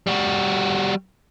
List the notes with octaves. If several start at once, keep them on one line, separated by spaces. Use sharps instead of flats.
G3 F#4